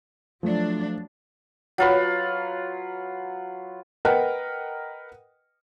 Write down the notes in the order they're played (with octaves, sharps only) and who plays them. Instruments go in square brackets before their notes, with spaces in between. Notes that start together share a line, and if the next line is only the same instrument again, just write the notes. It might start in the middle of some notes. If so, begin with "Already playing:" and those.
[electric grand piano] F3 A3 [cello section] F#3 D4
[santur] F#3 F4 B4
[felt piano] A#4 B4 D#5 F#5 G5